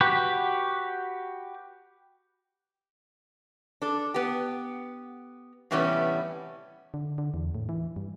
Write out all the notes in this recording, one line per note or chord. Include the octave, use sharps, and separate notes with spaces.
F#4 G4 B4
D4 A4
B3 G4
A2 C3 E3 G3 B3 C#4
D3
D3
E2
A2
E3
G2